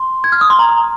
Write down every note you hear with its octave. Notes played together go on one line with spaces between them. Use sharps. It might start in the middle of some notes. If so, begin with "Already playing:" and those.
Already playing: C6
G#6
F6
D#6
C6
A#5